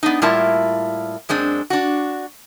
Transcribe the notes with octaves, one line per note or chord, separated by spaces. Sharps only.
B3 D4 D#4
A2 G3 A#3 E4 F4 A5
F#2 G#3 C4 D4
D4 F#4